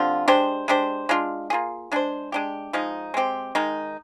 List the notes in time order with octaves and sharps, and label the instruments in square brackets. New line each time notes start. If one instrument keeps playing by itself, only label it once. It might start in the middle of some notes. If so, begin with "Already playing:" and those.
Already playing: [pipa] D3 G3 C4 F4
G#3 D4 G4 C5
G#3 D4 G4 C5
G#3 D4 F4
A#3 F4 G#4
G#3 D4 G#4 C5
G#3 D4 G4
F3 G#3 D#4
G#3 C4 G4
D#3 G#3 D#4